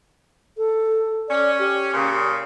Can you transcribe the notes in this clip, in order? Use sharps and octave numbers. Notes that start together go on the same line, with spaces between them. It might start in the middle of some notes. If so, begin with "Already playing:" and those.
A4
C#4 D5
G4
A#2 C#3